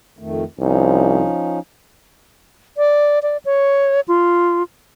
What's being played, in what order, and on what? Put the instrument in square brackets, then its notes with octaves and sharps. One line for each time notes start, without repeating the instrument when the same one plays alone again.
[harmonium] F2 D#3 A3
[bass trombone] C2 [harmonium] F3 C#4 D#4
[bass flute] D5
D5
C#5
F4